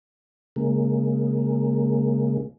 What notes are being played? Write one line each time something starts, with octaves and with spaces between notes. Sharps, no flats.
C#3 G#3 A#3